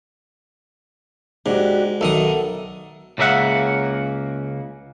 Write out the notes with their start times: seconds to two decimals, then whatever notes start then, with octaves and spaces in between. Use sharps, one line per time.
1.46 G#2 D4 F#4 G4
2.01 B1 D#3 A4 E5 F#5 D#6
3.18 C#2 C#3 A#3 E5 F#5